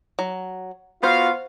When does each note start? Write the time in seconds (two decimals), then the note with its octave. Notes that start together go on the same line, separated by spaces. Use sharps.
0.19 F#3
1.03 B3 F4 F#4 C5 F5